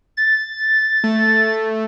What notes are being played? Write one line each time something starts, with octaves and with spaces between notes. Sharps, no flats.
A6
A3